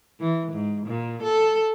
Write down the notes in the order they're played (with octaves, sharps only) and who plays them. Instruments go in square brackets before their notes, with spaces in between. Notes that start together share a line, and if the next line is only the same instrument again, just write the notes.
[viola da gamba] E3
G#2
A#2
A4